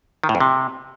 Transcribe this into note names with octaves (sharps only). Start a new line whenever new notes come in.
D#3
A2
F2
C3